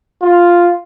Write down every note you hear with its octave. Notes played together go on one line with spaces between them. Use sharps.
F4